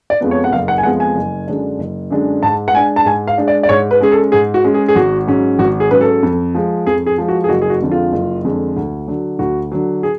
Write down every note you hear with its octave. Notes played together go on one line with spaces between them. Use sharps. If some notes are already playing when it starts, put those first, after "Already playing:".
D5
F2 F3 G#3 B3
C#5
F#5
F#1 F5
F#5
G#5
F2 F3 G#3 B3 F#5
G#5
F#1
F#2 D3 G#3 D4
F#1
F#2 D3 G#3 D4
G#2 A5
F#5
G#3 D4 G#5
A5
G#2 G#5
F5
G#3 D4
D5
D5
G#2 C#5
B4
G#3 C#4 G#4
A4
G#2 G#4
F#4
G#3 C#4
G#4
G#4
G#1 F#4
G#2 F#3 C#4
G#1 F#4
G#4
G#2 F#3 C#4 B4
A4
F2
F3 G#3
F2 G#4
G#4
F3 G#3
F#4
G#4
F#1 F#4
G#4
F#4
F2 D3 G#3
F4
F#1
F2 D3 G#3
D2
D3 F#3
D2 F#4
D3 F#3
G#4